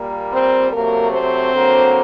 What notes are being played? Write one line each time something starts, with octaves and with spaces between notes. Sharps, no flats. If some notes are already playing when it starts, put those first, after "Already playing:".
Already playing: A#2 G3 A#3
C4 C5
C3 F#3 A3 A#3 A#4
C4 C5
D3 F#3 A#3